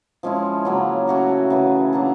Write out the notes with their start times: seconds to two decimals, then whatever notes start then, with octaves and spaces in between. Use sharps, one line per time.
0.23 F3 G#3 C#4 E4
0.65 C#3 F#3 A#3
1.08 A3 C#4 F#4 A#4
1.50 C#3 E3 A3
1.93 F#3 A#3 D4